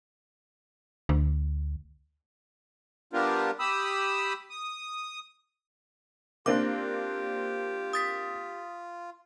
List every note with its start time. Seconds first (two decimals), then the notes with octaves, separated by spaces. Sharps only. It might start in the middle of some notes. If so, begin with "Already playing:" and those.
1.09 D2
3.13 G3 B3 D4 F4 G4 A#4
3.59 G4 B5 D#6 E6
4.50 D#6
6.46 A#3 C4 D4 F4 G4 D6
7.93 D#6 A6 B6